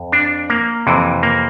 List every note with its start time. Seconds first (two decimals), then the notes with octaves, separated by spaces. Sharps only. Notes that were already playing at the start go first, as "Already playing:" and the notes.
Already playing: F2
0.12 D4
0.50 A#3
0.87 F2 C3 E3
1.23 A#3